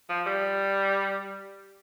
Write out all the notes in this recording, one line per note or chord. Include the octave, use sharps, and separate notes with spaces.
F3
G3